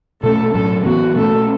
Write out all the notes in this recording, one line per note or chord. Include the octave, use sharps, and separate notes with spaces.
B2 A3 C#4 A4
A2 F#3 C#4 A4
A2 E3 B3 F#4
B2 A3 C#4 A4